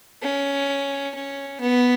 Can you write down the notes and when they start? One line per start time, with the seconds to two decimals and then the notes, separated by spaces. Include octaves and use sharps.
0.23 C#4
1.15 C#4
1.61 B3